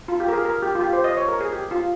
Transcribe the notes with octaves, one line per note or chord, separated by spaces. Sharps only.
F4
G4
A#4
G#4
A#4
G4
F4
G4
C5
D#5
C#5
A#4
G#4
G4
F4